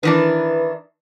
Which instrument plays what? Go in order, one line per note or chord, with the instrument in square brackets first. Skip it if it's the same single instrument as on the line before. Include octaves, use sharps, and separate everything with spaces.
[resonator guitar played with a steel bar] D#3 E3 D4 [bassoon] B4